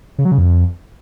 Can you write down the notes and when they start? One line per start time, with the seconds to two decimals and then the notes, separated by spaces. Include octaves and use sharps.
0.18 C#3
0.25 F#3
0.32 C#3
0.38 F2